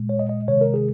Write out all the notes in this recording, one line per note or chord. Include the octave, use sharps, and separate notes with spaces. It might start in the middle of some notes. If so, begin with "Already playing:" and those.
Already playing: A#2 G#3
C#5
D#5
D#5
C3 D#3 G#3 C#5
A#4
G#4